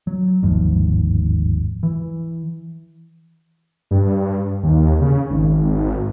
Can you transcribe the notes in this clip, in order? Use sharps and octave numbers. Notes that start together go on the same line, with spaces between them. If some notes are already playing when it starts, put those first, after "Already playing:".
F#3
G1 D#2 G#2 F3
E3
G2
D#2
C#3
G#1